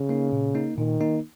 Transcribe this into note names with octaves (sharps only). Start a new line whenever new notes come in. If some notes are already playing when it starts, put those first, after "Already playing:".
Already playing: C#3
A#3 D#4
A#2
A#3 D#4
A#2 D#3
A#3 D#4